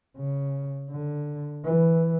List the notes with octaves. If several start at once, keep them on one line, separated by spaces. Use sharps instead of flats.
C#3
D3
E3